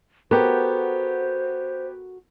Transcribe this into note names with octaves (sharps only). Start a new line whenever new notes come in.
B3 F#4 G4 A4 A#4 C5